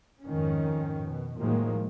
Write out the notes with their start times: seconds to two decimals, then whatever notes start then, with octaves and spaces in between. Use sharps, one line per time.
0.24 F2 G#2 D#3 C#4
1.04 B2
1.40 A2 D#3 F3 F#3 G#3 A#3